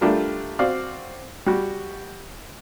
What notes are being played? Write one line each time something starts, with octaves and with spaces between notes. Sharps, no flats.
G3 A3 D4 F4 A#4
C4 F#4 D5 F5
G3 F#4